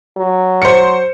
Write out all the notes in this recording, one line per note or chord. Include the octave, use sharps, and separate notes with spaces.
F#3
C5 C#7